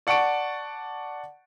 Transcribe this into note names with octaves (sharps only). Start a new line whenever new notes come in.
D5 F#5 A5 C#6 D7